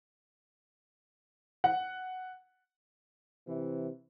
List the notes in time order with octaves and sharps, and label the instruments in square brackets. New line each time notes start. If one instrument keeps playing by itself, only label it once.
[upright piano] F#5
[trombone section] C3 E3